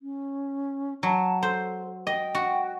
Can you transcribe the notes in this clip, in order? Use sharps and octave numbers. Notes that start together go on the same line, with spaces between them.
C#4
F#3 A5
A4 C5
D#5 G5
F#4